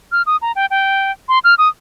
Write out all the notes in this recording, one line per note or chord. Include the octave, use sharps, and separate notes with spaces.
F6
D#6
A#5
G5
G5
C6
F6
D#6